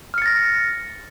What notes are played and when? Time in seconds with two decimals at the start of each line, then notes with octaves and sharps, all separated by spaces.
0.14 F6
0.18 C#7
0.22 A6
0.26 A#6